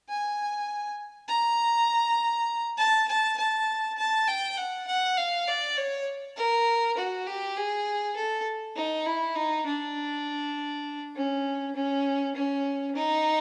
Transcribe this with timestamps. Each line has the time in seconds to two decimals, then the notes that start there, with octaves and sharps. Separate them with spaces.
0.09 G#5
1.28 A#5
2.78 A5
3.08 A5
3.38 A5
3.98 A5
4.28 G5
4.57 F#5
4.87 F#5
5.17 F5
5.48 D5
5.77 C#5
6.37 A#4
6.97 F#4
7.27 G4
7.57 G#4
8.16 A4
8.76 D#4
9.06 E4
9.36 D#4
9.66 D4
11.16 C#4
11.75 C#4
12.35 C#4
12.95 D#4